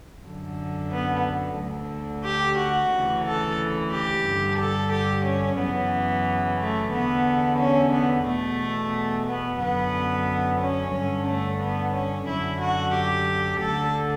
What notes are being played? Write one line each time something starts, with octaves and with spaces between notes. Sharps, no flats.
F#2 D3
B3
D2 D3
G4
F#4
D2 C#3 E3
A4
G4
G2 D3
A4
G4
C#4
F#2 C#3 E3 B3
A3
E2 D3 B3
C#4
B3
E2 B2 A3
B3
F#2 D3 B3
C#4
G2 D3
A3
B3
C#4
F#2 D3 E4
F#4
G4
D2 D3 A4